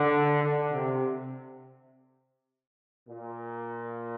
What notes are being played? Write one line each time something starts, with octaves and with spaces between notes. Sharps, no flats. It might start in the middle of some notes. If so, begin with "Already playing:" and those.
Already playing: D3
D3
C3
A#2